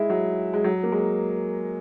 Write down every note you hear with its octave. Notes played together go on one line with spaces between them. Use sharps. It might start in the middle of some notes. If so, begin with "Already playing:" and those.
Already playing: G#3 E4
F#3
G#3
F#3
A#3
G#3